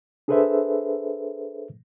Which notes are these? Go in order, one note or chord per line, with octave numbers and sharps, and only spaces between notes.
D4 G#4 A4 B4 C5 E5